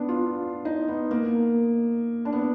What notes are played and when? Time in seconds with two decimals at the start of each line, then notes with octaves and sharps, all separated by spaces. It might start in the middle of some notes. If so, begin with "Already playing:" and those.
Already playing: B3 D4
0.09 F4
0.65 D#4
0.88 B3
1.11 A#3
2.25 D4
2.32 B3